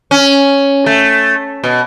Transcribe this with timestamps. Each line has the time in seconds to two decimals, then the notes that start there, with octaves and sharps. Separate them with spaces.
0.11 C#4
0.86 A3
1.64 B2